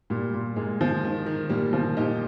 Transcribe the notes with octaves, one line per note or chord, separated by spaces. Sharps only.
A#2 G3
A#2
A#2 G#3
F3
D#3
D#3
A#2 G3 A#3
F3
A#2 D#4 G4